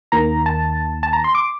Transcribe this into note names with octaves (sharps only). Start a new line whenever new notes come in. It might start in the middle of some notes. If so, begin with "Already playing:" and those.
D#2 D#3 A#3 A#5
A5
A5
A#5
C6
D6